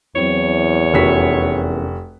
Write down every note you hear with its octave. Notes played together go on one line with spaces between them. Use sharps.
E2 F#3 C4 E4 C#5
F1 C#4 F#4 A#4 B6